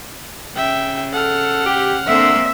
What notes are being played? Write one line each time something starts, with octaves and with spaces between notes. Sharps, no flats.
C#3 E5 G5
A4 F#5 F6
G4
D3 A#3 C4 E5